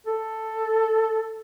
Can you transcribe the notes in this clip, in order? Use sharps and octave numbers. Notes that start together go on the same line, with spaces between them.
A4